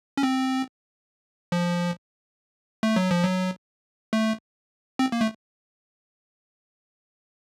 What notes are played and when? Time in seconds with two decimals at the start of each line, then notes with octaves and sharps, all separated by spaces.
0.17 C#4
0.23 C4
1.52 F3
2.83 A3
2.96 F#3
3.11 F3
3.23 F#3
4.13 A3
4.99 C4
5.12 A#3
5.21 A3